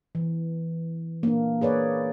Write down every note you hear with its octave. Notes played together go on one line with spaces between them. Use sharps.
E3
A#3 D4
G#4 B4 C#5 D5